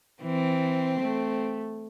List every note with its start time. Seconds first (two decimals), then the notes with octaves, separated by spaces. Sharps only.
0.22 E3 C4
1.01 A3